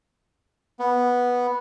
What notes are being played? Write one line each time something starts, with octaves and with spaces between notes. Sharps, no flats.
B3